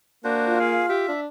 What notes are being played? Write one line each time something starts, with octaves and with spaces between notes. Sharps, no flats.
A#3 D4 F#4 C5
F4
G#4 F5
G4 E5
D4